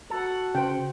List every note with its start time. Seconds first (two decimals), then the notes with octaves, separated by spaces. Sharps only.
0.10 F#4 A4 F#5
0.55 C#3 C5 G5